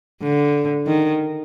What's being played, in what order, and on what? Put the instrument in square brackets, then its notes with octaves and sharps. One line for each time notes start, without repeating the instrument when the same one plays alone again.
[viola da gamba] D3
D#3